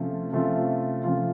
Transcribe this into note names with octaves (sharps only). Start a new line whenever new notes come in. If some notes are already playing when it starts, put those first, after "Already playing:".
Already playing: C3 F3 A3 C#4 F4
C3 F3 A3 C#4 F4
C3 F3 A3 C#4 F4